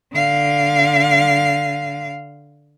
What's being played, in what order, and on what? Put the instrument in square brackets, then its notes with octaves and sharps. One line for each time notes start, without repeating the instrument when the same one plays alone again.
[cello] D3 F5